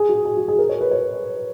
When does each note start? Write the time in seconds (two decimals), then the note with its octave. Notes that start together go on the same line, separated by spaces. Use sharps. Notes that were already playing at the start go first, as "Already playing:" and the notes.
Already playing: G#4
0.09 F#4
0.25 G#4
0.37 F#4
0.48 G#4
0.59 A#4
0.69 C#5
0.81 B4
0.91 C#5